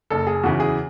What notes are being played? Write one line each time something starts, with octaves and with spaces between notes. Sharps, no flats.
F#1 A4
G#4
E2 C#3 E3 F#4
G#4